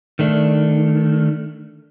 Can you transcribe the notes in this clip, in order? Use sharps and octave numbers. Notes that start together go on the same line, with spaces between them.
D#3 A3 D4